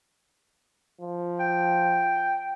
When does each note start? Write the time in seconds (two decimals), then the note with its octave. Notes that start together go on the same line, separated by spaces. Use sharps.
1.01 F3
1.40 G5